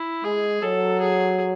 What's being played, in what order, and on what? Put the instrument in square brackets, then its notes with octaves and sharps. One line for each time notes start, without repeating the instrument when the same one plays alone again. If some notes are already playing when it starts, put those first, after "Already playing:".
Already playing: [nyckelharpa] E4
[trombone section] G#3 [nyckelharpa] G#4
[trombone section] F#3 [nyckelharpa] A4
[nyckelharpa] G#4